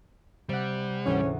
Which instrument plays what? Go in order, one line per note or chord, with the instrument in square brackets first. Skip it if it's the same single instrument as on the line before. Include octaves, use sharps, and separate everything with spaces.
[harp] C3 F#5 [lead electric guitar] G3
[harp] D2 G#2 E3 [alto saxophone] C#4